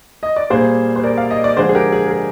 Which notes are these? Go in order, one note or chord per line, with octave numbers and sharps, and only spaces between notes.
D#5
D5
A#2 G3 A#3 G#4 C5
C5
A#4 D5
F5
D#5
D5
D3 F3 G#3 G#4 C5
G#4
G4 A#4
G#4
A#4
G#4